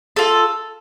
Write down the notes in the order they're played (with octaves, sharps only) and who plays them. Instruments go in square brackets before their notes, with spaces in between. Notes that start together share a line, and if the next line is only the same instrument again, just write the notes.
[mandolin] F4 A4